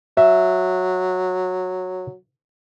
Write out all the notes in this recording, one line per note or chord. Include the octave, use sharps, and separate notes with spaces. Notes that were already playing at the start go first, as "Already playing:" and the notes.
F#3 E5